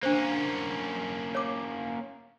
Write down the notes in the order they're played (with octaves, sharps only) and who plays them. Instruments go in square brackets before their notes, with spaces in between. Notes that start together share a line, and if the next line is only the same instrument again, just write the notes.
[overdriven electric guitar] A#3 C#4 [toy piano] D4 C5
[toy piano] C#5 D6